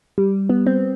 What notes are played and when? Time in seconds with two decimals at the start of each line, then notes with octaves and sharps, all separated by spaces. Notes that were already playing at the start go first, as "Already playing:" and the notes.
0.18 G3
0.50 B3
0.66 C4